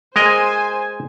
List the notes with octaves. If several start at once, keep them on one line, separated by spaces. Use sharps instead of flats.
G#3 A#4 C5 D#5 G#5